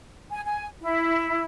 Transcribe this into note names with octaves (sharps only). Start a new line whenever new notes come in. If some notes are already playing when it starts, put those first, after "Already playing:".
G#5
G#5
E4